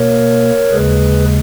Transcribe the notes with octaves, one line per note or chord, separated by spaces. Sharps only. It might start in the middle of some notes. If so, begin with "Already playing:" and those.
Already playing: B2 A#3 A#4 C#5
D#2 C#3 G#3 G#4 B4